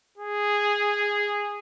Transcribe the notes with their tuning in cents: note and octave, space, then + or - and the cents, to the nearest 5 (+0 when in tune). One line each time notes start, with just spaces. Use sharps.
G#4 -10